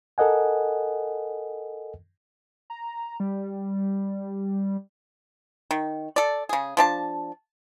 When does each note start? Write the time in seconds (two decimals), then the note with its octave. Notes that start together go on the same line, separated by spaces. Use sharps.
0.18 A4 A#4 D#5 F#5 G#5
2.70 A#5
3.20 G3
5.71 D#3
6.16 A4 D5
6.49 C#3 G#4
6.77 F3 D4 A5